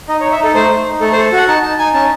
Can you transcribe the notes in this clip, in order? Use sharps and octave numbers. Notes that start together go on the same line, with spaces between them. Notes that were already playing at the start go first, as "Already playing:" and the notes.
D#4 D#5
C#5
D#4
E5
D#4 A4
A3 C5
A3
D#4
A3 A4
C5
A4
F#4 F#5
D#4 A5
D#4 A5
D#4 G#5
C#4 A5